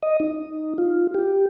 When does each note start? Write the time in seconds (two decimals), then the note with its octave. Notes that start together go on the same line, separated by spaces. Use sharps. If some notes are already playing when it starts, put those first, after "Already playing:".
0.03 D#5
0.20 D#4
0.78 F4
1.14 G4